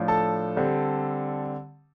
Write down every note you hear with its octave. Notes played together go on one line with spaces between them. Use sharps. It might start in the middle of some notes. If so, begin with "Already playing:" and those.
Already playing: A2 F3 D4
A4 A5
D3 G3 C4